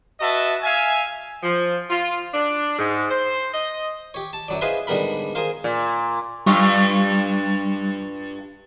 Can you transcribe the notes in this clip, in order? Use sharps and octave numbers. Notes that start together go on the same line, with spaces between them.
F#4 B4 D#5 E5 A5
E5 F5 G#5
F3
F4
D4
G#2
C5
D#5
G4 C#5
A5
F#2 F#3 D5
E4 G#4 B4 C5 D#5 F5
G#2 D3 G3 B3 A#4 B5
G#4 A#4 C5 F5
A#2
G2 G3 F4 C#6